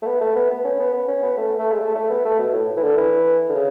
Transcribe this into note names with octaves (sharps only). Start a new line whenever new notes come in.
A3
B3
A3
B3
B3
C#4
B3
B3
C#4
B3
A3
A3
G#3
A3
A3
B3
A3
B2
A2
E3
D3
E3
D3
C#3